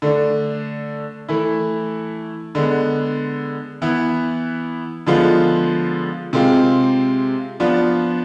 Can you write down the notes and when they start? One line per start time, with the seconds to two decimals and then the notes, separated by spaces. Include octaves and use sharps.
0.02 D3 A3 D4
1.29 E3 A3 E4
2.55 D3 G#3 B3
3.82 E3 B3 E4
5.07 D3 F3 G#3 B3 F4
6.33 C3 G#3 C4 F4
7.60 F3 B3 D4 F4